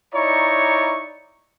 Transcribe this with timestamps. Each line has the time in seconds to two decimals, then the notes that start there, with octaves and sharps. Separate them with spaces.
0.14 D#4 E4 C#5 D5 A#5 C#6